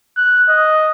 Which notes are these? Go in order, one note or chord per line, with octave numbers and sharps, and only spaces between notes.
F#6
D#5